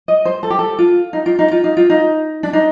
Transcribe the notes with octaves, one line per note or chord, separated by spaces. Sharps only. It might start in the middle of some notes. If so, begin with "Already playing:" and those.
D#5
C5
A4
G4
A4
F4
D#4
F4
D#4
F4
D#4
F4
D#4
D4
D#4